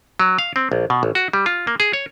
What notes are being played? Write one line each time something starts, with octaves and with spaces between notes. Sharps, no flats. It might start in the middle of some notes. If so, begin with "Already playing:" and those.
F#3
F5
C4
A#1
B2
A1
F#4
G3
F4
A#3
G#4
C#5